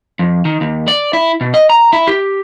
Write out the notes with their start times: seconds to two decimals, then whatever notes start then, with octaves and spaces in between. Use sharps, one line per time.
0.19 F2
0.45 D#3
0.61 D#2
0.88 D5
1.13 E4
1.41 B2
1.54 D#5
1.70 A#5
1.93 E4
2.08 G4